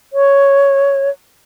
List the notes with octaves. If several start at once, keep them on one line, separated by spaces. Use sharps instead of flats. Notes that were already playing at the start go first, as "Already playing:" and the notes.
C#5